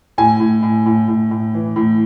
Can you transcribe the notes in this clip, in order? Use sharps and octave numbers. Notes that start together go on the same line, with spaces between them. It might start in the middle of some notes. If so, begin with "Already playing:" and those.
A2 G#5
A2
A2
A2
A2
A2
E3
A2